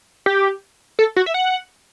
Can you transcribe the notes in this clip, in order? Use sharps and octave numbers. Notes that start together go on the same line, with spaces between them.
G4
A4
F#4
E5
F#5